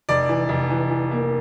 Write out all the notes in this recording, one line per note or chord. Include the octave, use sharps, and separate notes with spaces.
F1 D5
E3
F1
E3
E3
A#3